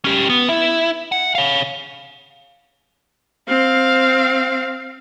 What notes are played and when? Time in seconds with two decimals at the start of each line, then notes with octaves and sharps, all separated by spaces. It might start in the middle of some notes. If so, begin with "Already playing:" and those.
0.05 C#4 G4
0.30 B3
0.49 E4
1.12 F#5
1.35 C#5 F5
3.48 C4 F5